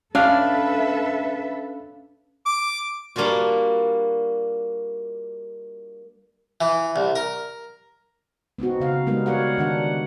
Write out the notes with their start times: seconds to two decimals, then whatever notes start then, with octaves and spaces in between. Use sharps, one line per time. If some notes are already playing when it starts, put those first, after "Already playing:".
0.15 C#4 D4 A4 B4 E5 F5
2.46 D6
3.16 G3 A#3 D4 F4 F#4
6.61 E3
6.96 C2
7.16 A#4
8.59 B3 C4 D#4 F#4
8.80 C#3 F5
9.06 G3 G#3 B3 D#4 A#4
9.26 F#4 A#4 C#5 D5 F5 F#5
9.58 D#3 D4 F#5